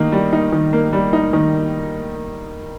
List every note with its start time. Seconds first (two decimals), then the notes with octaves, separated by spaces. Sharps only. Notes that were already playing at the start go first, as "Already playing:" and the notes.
Already playing: D#3 A#3 D#4
0.12 G3
0.33 D#4
0.52 D#3
0.73 A#3
0.93 G3
1.13 D#4
1.33 D#3